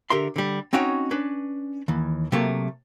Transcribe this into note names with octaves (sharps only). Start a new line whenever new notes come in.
D3 G4 A#4 E5 C6
D3 G3
C4 C#4 D#4 F#4 C#5 G5
C#4 D4 B4
D#2 E3
C3 F#3 A3 A#3